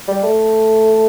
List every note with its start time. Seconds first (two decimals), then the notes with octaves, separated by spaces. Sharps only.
0.08 G3
0.23 A3